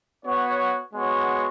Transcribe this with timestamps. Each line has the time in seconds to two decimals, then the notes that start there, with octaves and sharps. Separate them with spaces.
0.25 B3 F#4 C#5
0.93 G#3 B3 F#4 C#5